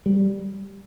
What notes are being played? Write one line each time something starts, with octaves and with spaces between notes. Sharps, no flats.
G3